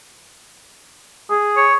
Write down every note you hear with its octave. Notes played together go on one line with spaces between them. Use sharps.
G#4
C#5